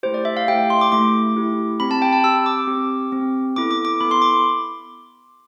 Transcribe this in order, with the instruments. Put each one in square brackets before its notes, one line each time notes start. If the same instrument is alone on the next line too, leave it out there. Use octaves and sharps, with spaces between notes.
[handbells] A3 E4 G4 C5
D5
E5
F5
A3 E4 G4 G5
C6
D6
A3 E4 G4 D6
A3 E4 G4
C4 G4 B5
A5
G5
A5
C4 G4 E6
D6
C4 G4
C4 G4
B3 E4 A4 D6
D6
D6
B3 E4 A4 B5
C6
D6